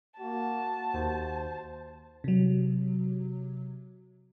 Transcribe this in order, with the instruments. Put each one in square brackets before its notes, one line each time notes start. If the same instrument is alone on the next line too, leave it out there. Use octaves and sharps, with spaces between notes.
[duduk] A#3 [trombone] F#4 [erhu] A5
[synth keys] D#2 [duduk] C5
[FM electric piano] C3 F#3